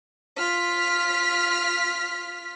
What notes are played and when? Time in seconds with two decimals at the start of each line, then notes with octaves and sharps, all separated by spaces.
0.38 F4 F6 B6